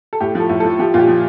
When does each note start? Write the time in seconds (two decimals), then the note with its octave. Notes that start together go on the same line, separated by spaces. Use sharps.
0.13 A4
0.20 A2 G4
0.35 F3 A4
0.50 A2
0.60 F3 A4
0.79 F3 G4
0.94 A#2 F4 G4
1.08 F3